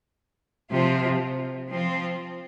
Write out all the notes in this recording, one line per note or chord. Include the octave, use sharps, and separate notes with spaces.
C3 F3 C4 F4
F3 C4 F4